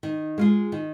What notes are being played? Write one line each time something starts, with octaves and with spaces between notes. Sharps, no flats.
D#3
G#3 F4 G#4
D#3